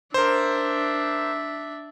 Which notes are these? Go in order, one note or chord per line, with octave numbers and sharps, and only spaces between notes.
D4 A#4 C5 E5